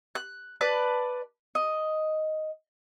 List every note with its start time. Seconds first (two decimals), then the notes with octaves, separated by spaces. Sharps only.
0.15 F#6
0.61 B4 D5 A5
1.55 D#5